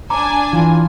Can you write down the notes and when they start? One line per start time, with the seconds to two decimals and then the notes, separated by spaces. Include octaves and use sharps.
0.10 D4 G#5 A#5 D6
0.53 E3 F4